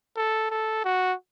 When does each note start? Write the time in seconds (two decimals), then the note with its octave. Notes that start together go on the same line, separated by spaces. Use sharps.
0.16 A4
0.50 A4
0.84 F#4